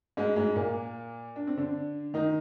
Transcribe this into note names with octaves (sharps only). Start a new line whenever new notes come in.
G#2 G#3
G#2 G#3
A#2 A#3
D4
C4
D3 D4
D#3 D#4